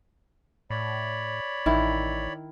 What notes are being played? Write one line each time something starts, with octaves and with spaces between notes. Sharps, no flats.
A2 C#5 D5 B5
A1 D#3 E4